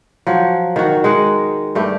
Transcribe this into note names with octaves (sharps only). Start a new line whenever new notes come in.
F3 F#3
D#3 F#4
G#3 D#4 F#5
G2 A3 G4